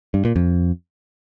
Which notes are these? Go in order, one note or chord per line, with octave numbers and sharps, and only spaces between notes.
G2
A#2
F2